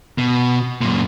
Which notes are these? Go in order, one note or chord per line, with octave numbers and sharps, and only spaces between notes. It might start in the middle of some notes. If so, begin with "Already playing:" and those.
B2
F#2 A#2